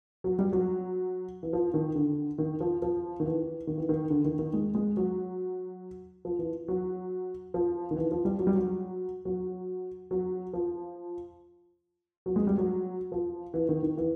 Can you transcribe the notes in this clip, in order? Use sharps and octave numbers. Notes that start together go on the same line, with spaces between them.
F#3
G3
F#3
E3
F3
D#3
D3
D#3
F3
F3
D#3
E3
D#3
E3
D#3
D3
D#3
D#3
G#3
G#3
F#3
F3
E3
F#3
F3
D#3
E3
F3
G3
F#3
G3
F#3
F#3
F#3
F3
F#3
G#3
G3
F#3
F3
E3
D#3
D#3
E3